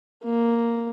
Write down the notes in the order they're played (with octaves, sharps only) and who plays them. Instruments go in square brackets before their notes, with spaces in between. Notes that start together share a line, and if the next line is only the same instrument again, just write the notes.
[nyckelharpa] A#3